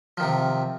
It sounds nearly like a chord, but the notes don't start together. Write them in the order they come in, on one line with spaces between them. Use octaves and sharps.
F3 D#3 C3